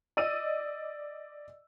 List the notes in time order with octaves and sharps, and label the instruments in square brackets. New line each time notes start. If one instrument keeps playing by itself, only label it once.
[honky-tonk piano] D5 D#5 E6 D#7